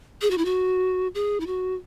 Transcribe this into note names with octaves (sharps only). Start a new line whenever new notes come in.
G#4
F#4
E4
F#4
G#4
E4
F#4